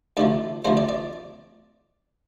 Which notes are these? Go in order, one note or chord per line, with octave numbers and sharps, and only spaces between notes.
D2 C3 F3 D5
D2 C3 F3 C5
D5
D5